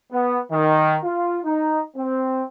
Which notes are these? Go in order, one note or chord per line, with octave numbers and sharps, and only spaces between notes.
B3
D#3
F4
D#4
C4